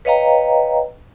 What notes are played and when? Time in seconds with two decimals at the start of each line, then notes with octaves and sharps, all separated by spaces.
0.05 B4 C#5 D#5 F5 G5 A#5